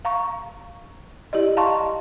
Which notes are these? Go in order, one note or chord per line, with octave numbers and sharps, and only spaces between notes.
F5 A#5 C#6
E4 G4 D5 D#5
D#5 F5 A5 A#5 C6 C#6